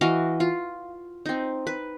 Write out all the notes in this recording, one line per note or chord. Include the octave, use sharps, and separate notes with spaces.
E3 F#4 D#5 F5
F4
C4 D#4
B4